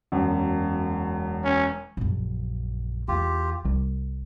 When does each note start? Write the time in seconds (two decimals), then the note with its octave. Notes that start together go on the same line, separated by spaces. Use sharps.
0.12 E1 F#2
1.44 C#4
1.97 A#1 F#2
3.08 E2 F4 G4
3.65 C2